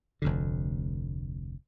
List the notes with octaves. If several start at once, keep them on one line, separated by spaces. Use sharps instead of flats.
F1 D2 D3